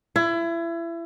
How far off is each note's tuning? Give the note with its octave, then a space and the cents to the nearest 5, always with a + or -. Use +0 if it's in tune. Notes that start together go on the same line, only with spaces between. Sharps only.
E4 +30